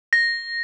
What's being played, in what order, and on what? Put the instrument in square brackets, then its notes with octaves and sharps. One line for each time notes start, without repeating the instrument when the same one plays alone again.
[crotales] A#6